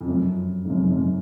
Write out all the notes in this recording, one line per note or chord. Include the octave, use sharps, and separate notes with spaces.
F2
F#2
G#2
F#2
F#2